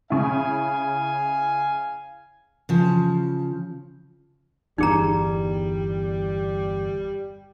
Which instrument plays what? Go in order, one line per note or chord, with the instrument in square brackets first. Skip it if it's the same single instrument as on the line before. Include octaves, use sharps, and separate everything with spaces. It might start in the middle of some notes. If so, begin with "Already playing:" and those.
[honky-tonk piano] C#3 E4 [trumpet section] F5 G#5
[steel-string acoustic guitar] C#3 F3
[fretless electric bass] G1 E2 [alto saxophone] G3 [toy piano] D#4 G#4 A#5